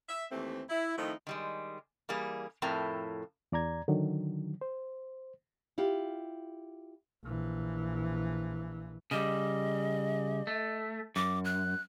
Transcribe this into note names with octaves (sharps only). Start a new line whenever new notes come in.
E5
D#2 E3 A3 C4
E4
D#3 F3 A3 C4 D#4 E4
D#3 G3 G#3
E3 G3 A#3 G#4
F2 A2 E4 A#4 G5
E2 D5 A#5 G#6
D3 D#3 F#3
C5
E4 F4 G4
A#1 E3
C#3 G3 D#5
A3
F#2 D6
F#6